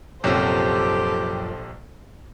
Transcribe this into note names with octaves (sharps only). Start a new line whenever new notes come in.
A#1 F#2 C3 F3 G4 A4 C5